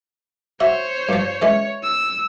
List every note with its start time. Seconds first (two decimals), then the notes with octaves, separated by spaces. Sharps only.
0.60 F#4 C5 C#5 E5
1.09 G2 F3
1.42 E3 G#3 C#4 C#5
1.83 E6